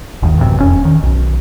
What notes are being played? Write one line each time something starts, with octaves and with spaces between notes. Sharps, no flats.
G1 D#2 D#3
A1 F#2 C3
E1 F2 C#4
D#3
B1